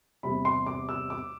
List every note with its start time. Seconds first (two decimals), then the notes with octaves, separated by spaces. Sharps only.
0.23 E2 C3 G3 B5
0.45 C6
0.66 D6
0.89 E6
1.10 D6